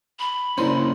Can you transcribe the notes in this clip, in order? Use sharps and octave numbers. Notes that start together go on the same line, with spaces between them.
B5
C#3 A#3 C#4 D4 E4 C5 D5